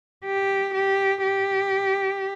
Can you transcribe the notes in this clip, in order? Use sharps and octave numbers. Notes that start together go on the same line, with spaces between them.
G4
G4
G4